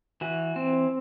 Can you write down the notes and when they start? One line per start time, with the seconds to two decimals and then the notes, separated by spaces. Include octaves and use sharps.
0.21 E3 F#4
0.56 C4